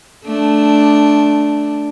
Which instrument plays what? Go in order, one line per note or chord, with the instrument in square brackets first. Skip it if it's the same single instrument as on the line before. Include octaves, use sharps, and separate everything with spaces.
[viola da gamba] A3 D4